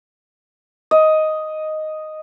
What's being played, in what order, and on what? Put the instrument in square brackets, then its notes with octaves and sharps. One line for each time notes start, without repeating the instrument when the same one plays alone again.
[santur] D#5